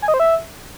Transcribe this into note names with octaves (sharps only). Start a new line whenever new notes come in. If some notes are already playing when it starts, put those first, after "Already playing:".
G#5
D#5
C5
E5